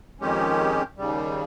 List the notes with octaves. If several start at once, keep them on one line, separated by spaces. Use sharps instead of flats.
F2 D#3 G#3 C#4 G4
D#2 C#3 G3